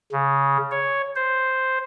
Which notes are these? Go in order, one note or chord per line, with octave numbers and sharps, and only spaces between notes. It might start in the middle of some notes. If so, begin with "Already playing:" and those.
C#3
C#5
C5